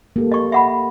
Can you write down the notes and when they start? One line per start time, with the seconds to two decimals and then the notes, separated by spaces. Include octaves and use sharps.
0.16 A#3 G4 A4
0.32 D#5 C#6
0.52 E5 F#5 B5